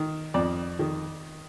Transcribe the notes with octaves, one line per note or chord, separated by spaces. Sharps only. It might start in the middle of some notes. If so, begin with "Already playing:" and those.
Already playing: D#3
F2 D5
D#3